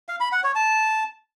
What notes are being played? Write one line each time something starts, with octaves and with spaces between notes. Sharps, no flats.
F5
B5
F#5
C#5
A5